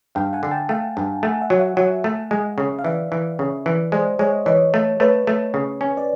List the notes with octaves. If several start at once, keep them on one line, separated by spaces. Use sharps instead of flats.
G2 F5 G5
F#5 G#5
D3
G5 A5
A3 F5 G5
G2
A3 F#5 G#5
E5 F#5
F#3
E5 F#5
F#3 E5 F#5
A3
G#3
C#3
F5
E3 D5 E5
E3
C#3
E3
G#3 C5 D5
G#3 C#5 D#5
E3 C#5 D#5
A3
A3 B4 C#5
A3
C#3
C#4
D5